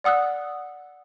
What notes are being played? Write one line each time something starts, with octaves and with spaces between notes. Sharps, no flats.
D5 F#5 D#6 E6 F#6